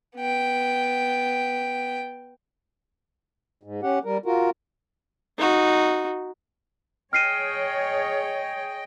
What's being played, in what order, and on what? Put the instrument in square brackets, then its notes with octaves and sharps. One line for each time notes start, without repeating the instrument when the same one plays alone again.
[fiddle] B3 G5
[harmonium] G#2
C#4 G4 F#5
G3 A#4
F4 F#4 A#4
[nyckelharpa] D#4 F#4
[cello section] G#4 C#5 [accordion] D#5 G5 [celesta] F6 C7 D#7